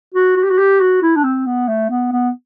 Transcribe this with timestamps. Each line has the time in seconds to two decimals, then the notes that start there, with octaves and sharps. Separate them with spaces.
0.14 F#4
0.36 F#4
0.43 G4
0.50 F#4
0.58 G4
0.80 F#4
1.02 E4
1.16 D4
1.24 C4
1.46 B3
1.68 A3
1.90 B3
2.12 B3